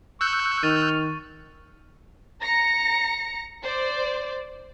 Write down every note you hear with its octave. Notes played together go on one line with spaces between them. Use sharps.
C#6 E6 F#6 G6
D#3 C#6 F6 A6 D#7
A#5 A#6 C#7
C5 D5